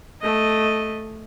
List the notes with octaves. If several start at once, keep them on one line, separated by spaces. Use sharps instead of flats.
A3 D#5